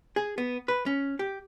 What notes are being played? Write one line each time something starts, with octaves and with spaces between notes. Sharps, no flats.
G#4
B3
B4
C#4
G4